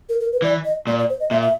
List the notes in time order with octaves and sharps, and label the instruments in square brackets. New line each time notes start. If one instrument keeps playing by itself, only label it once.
[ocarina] A#4
A#4
B4
[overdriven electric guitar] E3 [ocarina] D5
[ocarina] D#5
[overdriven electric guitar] A#2 [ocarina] D5
[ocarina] D5
C5
D#5
[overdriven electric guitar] A#2 [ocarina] E5
[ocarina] E5